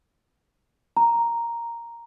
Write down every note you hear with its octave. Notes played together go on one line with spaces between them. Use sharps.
A#5